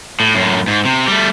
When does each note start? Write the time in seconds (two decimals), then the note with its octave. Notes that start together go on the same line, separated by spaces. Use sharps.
0.20 A2
0.35 F#2 A2
0.67 G#2
0.85 C3
1.08 G3 A3